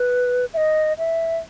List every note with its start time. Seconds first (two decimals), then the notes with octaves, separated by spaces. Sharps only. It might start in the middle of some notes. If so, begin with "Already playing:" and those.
Already playing: B4
0.54 E5
0.57 D#5
0.98 E5